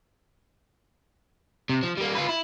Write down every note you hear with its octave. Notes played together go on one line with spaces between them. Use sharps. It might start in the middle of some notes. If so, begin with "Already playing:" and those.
C3
F3
G3 A#3
F4 B4
E4